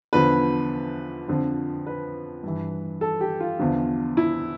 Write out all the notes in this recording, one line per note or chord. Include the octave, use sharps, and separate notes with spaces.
E2 D3 F3 B4
F2 D3 F3
B4
G2 E3
A4
G4
F4
E2 D3 F3
E4